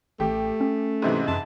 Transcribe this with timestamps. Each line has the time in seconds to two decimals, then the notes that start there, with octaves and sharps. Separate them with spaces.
0.20 A1 A3 G4
0.61 C#4
1.02 G#2 C3 E3
1.28 F#2 A5